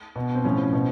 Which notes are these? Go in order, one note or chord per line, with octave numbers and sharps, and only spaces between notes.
B2
C4
A2 F3 C#4
B2